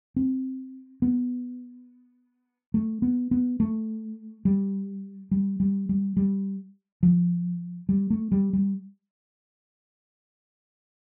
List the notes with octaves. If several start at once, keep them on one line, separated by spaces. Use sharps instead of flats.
C4
B3
A3
B3
B3
A3
G3
G3
G3
G3
G3
F3
G3
A3
G3
G3